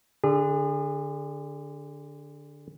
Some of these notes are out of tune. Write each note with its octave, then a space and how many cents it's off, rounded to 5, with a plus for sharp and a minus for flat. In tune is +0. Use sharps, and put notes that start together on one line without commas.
D3 +0 G#4 -35